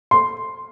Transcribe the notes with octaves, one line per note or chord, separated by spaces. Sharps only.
C6